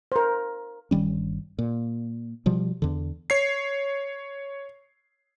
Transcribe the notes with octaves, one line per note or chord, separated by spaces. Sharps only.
A#4 C5
G1 D#3 G3 C#4
A#2
B2 F3 G3
E2 D3
C#5 C7